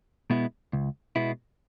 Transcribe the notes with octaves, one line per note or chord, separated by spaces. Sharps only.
B2 G#3 B3 E4
C#2
B2 G#3 B3 E4